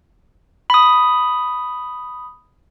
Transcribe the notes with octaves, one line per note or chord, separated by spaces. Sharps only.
B5 D#6